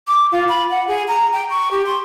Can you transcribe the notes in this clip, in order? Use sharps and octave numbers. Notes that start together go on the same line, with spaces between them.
D6
F4
B5
F#5
G#4
A#5
G5
C#6
G4
C6